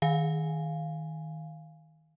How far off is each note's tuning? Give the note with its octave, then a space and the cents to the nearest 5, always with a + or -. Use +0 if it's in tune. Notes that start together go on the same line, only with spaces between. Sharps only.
D#3 +15 F5 +0 G#5 +0